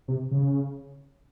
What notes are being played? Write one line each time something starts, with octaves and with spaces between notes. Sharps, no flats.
C3
C#3